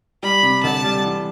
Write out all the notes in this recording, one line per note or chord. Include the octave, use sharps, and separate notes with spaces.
G3 B5
C3
D2 A5
G3
E3